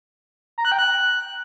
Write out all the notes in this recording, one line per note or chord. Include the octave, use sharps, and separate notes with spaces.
A#5
F#6
G5
F#6